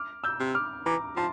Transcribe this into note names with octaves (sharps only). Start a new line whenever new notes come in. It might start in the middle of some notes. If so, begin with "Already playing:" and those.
Already playing: D6 F6
E6 G6
C3
D6 F6
E3 A#5 D6
F3 A5 C6